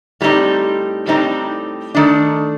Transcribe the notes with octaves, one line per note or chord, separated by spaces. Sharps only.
A2 G3 C4 D#4
A2 G3 C4 D#4
D#3 A3 D4